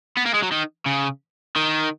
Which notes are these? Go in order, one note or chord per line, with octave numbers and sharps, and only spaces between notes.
B3
A#3
G#3
F#3
D#3
C#3
D#3